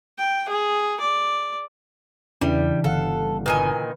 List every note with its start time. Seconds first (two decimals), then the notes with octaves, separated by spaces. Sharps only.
0.18 G5
0.49 G#4
1.00 D5
2.41 E2 C#3 E3 G3 D4 E5
2.84 G1 D3 A4 F5 F#5
3.46 A#2 D#3 B4 G#5